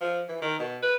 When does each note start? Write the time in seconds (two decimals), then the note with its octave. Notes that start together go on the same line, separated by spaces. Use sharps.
0.01 F3
0.29 E3
0.42 D#3
0.59 B2
0.83 B4